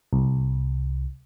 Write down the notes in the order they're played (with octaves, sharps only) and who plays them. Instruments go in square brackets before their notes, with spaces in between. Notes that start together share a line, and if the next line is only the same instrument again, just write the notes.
[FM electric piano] C2